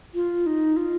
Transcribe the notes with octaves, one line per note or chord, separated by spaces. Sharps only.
F4
D#4
F4